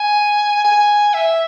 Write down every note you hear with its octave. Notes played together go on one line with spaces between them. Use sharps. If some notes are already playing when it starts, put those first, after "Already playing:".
Already playing: G#5
G#5
E5